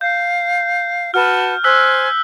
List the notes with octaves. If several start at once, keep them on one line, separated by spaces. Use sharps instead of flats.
F5 G6
F#4 B4 A5 F6
C5 G#5 E6 F#6 B6